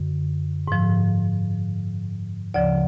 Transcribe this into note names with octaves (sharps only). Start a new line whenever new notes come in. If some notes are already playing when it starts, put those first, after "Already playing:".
Already playing: F#2 D3
G#2 F3
D2 C#3 F3 D5